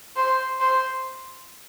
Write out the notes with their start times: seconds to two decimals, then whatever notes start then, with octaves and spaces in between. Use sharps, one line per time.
0.16 C5
0.60 C5